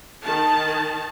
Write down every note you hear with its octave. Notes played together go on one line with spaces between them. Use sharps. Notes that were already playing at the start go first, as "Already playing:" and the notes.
D#3 A5